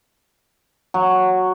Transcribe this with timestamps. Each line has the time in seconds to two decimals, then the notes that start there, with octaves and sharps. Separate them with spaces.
0.94 F#3